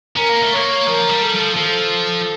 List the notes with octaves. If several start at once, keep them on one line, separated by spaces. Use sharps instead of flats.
C#4 A#4
A#3
A3
A#3 C#5
F3 A#4
G3
A4
F3
F3 A4